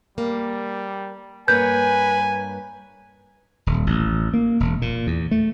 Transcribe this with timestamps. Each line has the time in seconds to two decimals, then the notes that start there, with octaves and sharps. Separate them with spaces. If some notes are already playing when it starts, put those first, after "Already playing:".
0.18 G3 A#3
1.48 G2 A#3 B4 C#5 G#5 G6
3.67 D#1
3.87 A1
4.34 A#3
4.60 E1
4.82 A#2
5.07 E2
5.31 A3